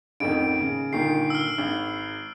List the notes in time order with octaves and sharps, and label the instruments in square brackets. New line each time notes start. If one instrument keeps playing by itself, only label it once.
[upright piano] A1 F2 D#3 [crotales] D7
[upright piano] C#3
[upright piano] G1 A#2 D#3 [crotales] C7
[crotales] E6 F6
[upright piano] G#1